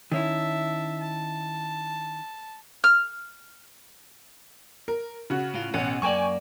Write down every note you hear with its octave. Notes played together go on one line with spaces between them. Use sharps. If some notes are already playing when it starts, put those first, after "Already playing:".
D#3 C#4 E4 E5 A5
A5
F6
A#4
C#3 F#4
A2 F4
A1 B2 C#4 F#5
F#2 A#3 D5 G5 G#5 C#6